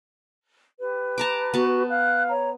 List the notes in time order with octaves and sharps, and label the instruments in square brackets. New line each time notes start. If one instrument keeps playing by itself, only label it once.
[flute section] G4 B4
[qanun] A5 A#5 D6
[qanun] B3 A5 [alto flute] F#4
[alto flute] F5 [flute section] F#6
[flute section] C#5 A#5